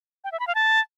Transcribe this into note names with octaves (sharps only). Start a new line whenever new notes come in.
G5
E5
B5
F5
A5